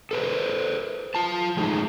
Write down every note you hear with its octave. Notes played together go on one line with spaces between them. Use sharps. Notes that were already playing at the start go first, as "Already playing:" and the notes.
A4 B4 C5
F4 A5
F3 G#3 A3 D#4